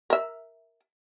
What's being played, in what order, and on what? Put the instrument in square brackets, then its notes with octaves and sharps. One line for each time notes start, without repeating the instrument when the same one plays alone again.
[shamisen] A#4 E5